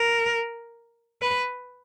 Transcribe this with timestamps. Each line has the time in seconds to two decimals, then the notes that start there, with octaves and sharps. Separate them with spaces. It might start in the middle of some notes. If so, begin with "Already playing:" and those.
Already playing: A#4
1.22 B4